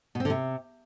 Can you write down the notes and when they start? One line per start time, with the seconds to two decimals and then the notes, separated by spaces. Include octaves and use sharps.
0.15 B2
0.20 C4
0.25 D3
0.30 C3